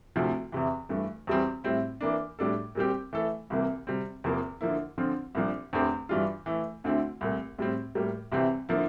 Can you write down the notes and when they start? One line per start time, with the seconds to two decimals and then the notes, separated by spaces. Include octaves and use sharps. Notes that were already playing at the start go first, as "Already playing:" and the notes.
0.16 D2 C3 F3 A3 E4
0.52 E2 C3 E3
0.89 G2 E3 A3
1.27 E2 E3 G3 C4
1.64 A2 G3 C4 E4
2.01 E3 A#3 D4
2.39 A2 G3 D4 A4
2.75 A#2 G3 C4 G4
3.13 E3 A3 E4 A4
3.50 C2 C3 E3 A#3
3.87 C3 G3 C4
4.24 E2 C3 F3 A#3
4.61 D3 F3 A#3 E4
4.98 D3 F3 C4 F4
5.35 C2 A#2 F3 A#3 D4
5.73 E2 D3 A3 C4 G4
6.09 G2 E3 G3 D4 F4
6.46 E3 A3 E4 A4
6.84 D2 D3 A3 C4 E4
7.21 C2 A#2 A3
7.59 A2 G3 C4
7.95 A2 G3 A#3
8.32 C2 C3 E3 G3 C4
8.69 D3 F3 A#3 E4